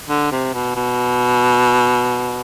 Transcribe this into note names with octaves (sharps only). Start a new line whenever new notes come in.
D3
C3
B2
B2